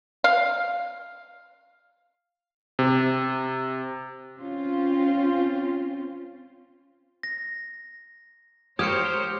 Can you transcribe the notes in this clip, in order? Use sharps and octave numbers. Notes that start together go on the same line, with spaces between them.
F5
C3
C4 C#4 F4
A#6
G#3 G4 A#4 C5 C#5 D#6 F6 C#7